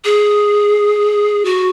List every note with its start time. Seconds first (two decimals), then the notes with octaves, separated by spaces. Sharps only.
0.05 G#4
1.45 F#4